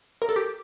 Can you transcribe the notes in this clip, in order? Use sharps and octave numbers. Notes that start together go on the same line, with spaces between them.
A#4
A4
G4